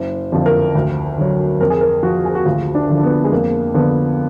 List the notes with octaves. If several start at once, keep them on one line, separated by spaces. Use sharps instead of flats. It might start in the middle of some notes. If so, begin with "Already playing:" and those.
Already playing: F#1
F2 D3 F3
A#4
D2
D3 F#3
F2 A#4
G#4
A#4
F3 F#4
G#4
F#4
D2 F4
D4
D3 F3
D4
B3
G#3
F2 A#3
D3 F3 B3